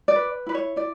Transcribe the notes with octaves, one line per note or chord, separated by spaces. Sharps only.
D5
B4
E4 B4
C#5
E4 D5